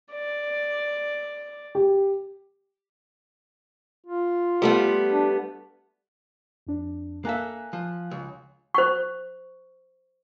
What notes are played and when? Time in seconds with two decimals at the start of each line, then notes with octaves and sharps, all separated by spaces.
0.13 D5
1.75 G4
4.07 F4
4.62 G3 A3 B3
5.10 D4
6.67 F2 D4
7.25 A#3 A4 E5 F5 G#5 F#6
7.73 F3
8.11 C#2
8.75 C5 C#6